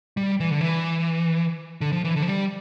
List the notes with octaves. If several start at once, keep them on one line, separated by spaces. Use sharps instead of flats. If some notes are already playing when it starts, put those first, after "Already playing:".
G3
E3
D3
E3
D3
F3
E3
D3
F3
G3